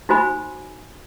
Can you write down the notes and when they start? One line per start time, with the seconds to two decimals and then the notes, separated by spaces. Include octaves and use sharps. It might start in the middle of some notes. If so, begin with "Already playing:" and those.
0.09 D#4 F#4 C5 G#5 B5